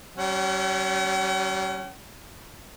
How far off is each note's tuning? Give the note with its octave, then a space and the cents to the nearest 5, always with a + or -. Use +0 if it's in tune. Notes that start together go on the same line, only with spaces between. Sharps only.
G3 -45 C#4 +0 F#5 +45